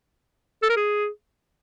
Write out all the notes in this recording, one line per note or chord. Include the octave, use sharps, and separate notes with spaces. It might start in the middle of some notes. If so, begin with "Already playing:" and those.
A4
A#4
G#4